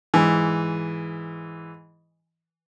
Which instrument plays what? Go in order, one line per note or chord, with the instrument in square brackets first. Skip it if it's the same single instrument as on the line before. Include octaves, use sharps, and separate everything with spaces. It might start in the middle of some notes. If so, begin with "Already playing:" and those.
[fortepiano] G#2 E3